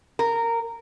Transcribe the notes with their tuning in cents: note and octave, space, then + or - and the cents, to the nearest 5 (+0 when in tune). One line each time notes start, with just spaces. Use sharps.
A#4 -15